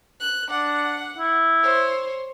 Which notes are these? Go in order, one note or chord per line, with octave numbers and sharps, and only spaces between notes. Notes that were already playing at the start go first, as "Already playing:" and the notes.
F#6
D4 F#5
E4
C5 C#5